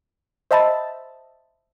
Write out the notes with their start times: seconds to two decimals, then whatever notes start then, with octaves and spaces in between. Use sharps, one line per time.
0.51 C5 D#5 E5 A5 B5 A6